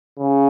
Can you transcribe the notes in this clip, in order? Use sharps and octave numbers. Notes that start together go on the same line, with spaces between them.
C#3